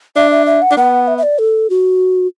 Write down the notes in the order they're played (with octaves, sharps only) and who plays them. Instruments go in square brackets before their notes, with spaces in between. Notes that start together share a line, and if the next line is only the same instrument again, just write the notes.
[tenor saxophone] D4 [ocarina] E5
[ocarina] E5
E5
F#5
[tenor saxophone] D4
[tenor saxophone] B3 [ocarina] F#5
[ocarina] E5
E5
D5
A4
F#4